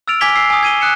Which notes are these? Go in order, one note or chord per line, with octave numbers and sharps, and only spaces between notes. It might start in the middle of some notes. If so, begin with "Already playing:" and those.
E6 F6 A6 D7 F7
G#5 D6 G#6 B6 F7 G7
G#5 E6 C7
G#5 D#6
G#6 D#7 G7
D#6 F#6 C#7 E7